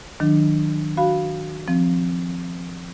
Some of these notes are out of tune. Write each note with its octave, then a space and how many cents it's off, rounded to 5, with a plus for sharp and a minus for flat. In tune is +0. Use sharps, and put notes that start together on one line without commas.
D#3 +0 F#3 -20 D4 +20
F#4 +0 F5 +0 B5 -5
F3 +0 C4 +5